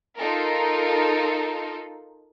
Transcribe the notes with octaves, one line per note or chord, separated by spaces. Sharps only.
D#4 F4 A4 A#4